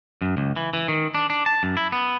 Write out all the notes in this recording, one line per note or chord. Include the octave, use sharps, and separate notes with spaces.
F#2
C#2
E3
E3
D#3
D4
D4
A5
F#2
E4
B3